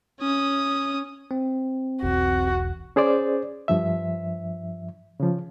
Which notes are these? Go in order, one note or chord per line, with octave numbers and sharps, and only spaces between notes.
C#4 D#6
C4
E1 B1 E2 F#4
C#4 G#4 C5 D5
G2 F3 E5
C#3 F3